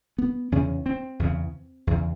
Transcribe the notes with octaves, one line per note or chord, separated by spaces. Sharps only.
B3
E2 C#3 C#4
C4
E2 C#3
E2 C#3